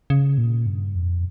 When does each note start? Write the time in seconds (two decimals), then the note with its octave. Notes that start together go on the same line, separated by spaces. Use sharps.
0.10 C#3
0.38 A#2
0.66 G2
0.95 F2